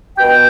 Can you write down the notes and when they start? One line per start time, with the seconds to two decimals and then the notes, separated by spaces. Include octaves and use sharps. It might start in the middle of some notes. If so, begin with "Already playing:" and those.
0.19 B2 G5